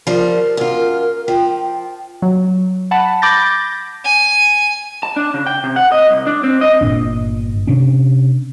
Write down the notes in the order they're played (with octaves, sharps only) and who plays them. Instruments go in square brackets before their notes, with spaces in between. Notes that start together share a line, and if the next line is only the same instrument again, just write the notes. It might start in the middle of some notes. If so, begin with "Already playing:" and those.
[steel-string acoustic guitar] F3 G3 [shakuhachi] A#4
[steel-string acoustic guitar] F#2 F4
[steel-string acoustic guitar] F3 [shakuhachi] G5
[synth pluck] F#3
F#5 A5 B5
B5 D6 G6 A6 A#6
[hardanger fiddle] G#5
[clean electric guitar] A5
D4
C#3
G5
C3
F#5
D#5
C2
D4
C4
D#5
[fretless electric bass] G1 A#2 D4
C3 C#4 D4